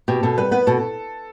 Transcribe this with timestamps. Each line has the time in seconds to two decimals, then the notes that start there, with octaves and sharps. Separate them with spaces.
0.08 B2 G4
0.23 B2 A4
0.38 G3 B4
0.51 B3 B4
0.67 B2 A4